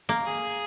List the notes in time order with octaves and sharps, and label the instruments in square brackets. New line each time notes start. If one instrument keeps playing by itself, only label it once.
[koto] A#3
[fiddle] G#4